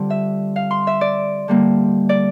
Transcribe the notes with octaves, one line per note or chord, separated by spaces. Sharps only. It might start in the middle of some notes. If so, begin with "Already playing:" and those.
Already playing: D3 G3 C4 F4
E5
F5
C6
E5
D5
D3 G3 A#3
D5